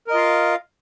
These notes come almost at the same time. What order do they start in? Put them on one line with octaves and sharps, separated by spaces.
A#4 D#5 F4 F5